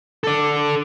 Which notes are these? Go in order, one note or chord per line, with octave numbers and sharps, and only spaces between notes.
A4 D5